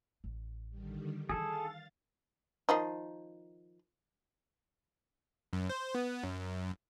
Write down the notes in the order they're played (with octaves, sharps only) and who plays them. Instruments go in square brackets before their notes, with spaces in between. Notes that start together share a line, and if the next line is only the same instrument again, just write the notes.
[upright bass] A1
[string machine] D3 D#3 G3
[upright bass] D#3 E3 [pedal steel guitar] G#4 A4 [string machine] F5 A6
[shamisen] D#3 F3 D#4
[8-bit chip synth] F#2
C5
B3
F#2